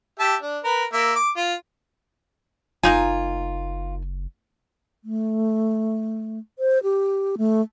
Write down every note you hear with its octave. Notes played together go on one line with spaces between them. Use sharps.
G4 E5 A5
D4
A#4 B4
A#3 E5
D6
F4
F#1 A#3 D#4 F4 G#5
A3
C5
G4
A3